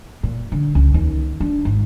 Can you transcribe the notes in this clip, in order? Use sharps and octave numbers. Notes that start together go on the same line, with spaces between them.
A#2
D3
C#2
D#2
D4
G#1